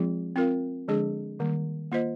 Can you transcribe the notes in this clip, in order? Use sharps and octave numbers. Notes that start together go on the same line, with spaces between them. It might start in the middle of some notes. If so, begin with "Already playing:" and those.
Already playing: F3 G#3 C4 F4 G#4
C4 F4 A#4 F5
D3 F3 G#3 D4 G#4
D#3 G3 A#3
A#3 F4 C5 D#5